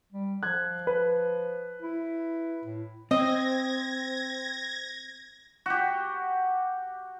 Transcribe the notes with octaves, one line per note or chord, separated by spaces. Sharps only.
G3
F3 F#6 G#6
B4
E4
A2
C4 C5 D#5 G5 E6 G#6 A#6
F#4 G4